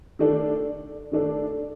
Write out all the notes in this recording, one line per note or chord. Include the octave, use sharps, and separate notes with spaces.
D#3 A3 D4 A4
D#3 A3 D4 A4